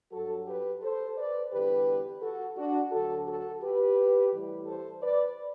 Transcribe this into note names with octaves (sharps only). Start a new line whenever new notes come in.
G2 F#3 F#4 A4
G4 B4
A4 C5
B4 D5
E2 D3 G3 G4 B4
F#4 A4
D4 F#4
D2 D3 F#3 F#4 A4
F#4 A4
G4 B4
A2 E3 G3
A4 C5
B4 D5